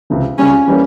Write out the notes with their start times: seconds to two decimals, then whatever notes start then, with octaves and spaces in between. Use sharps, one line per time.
0.10 C#2 C3 E3
0.38 C#2 C#3 G3 C#4
0.68 E3 G3 A#3 C#4